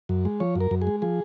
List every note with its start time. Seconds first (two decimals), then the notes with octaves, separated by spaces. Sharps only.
0.09 F#2
0.25 G#3
0.40 F3 C#5
0.55 F#2
0.61 A#4
0.71 F#2
0.82 G#4
0.87 G#3
1.02 F3 G#4